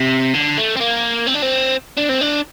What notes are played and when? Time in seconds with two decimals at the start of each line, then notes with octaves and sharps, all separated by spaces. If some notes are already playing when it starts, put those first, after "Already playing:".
Already playing: C3
0.34 D3
0.57 A3
0.76 C4
0.80 A#3
1.27 C4
1.35 D4
1.43 C4
1.97 D4
2.09 C4
2.21 D4